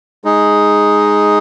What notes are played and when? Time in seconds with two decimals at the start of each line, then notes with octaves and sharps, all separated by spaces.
0.24 G#3 D#4 G#4